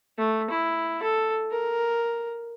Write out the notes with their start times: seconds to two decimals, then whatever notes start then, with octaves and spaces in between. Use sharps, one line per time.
0.18 A3
0.50 E4
1.03 A4
1.51 A#4